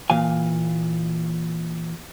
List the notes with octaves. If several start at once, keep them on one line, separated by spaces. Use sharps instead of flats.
A#2 E3 F5 G#5